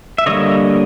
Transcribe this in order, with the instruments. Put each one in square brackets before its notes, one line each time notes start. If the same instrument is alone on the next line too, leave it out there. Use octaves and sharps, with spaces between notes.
[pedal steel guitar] E5
D3 G3 A#3 C#5 D#5